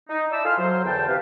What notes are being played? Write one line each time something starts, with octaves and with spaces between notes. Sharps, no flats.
D#4
E4 D5 E5 A5 D6 E6
F4 A4 G#5 C6 F6
F#3 C5
E2 D3 G5 A5
C3 B4 F5